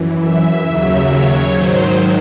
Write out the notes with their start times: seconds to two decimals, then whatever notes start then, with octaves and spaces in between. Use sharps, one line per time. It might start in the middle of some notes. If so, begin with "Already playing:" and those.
Already playing: F#2 E3
0.21 E5
0.64 D#2 C#3 F#3 E5
1.09 C#5
1.52 G#2 D#3 F#3 C5